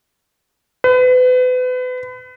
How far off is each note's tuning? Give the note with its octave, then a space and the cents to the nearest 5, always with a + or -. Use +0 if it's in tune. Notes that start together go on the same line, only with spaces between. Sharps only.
B4 +35